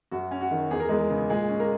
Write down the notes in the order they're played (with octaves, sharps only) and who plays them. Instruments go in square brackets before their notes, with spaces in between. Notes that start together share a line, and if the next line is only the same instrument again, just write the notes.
[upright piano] F#2 F#4
C#4
F#4
D#3
E2 G#4
A#4
E2 G#3 G#4
C#3
A#2 G#3 G#4
C#4
A#3 A#4